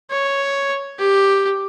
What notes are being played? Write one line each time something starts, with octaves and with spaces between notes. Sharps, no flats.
C#5
G4